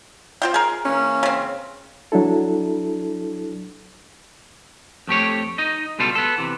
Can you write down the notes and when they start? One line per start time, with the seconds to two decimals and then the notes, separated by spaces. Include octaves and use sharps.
0.42 C4 F4 G5
0.54 G#4 A#4
0.85 E3 A#3 C#4
1.23 C#3 C4
2.12 F#3 D4 E4 A4
5.07 F2 A3 G4 C#5
5.58 D#4 D#5
5.99 C#2 B2 G3 F4 A4
6.15 B3 A4
6.38 C3 E3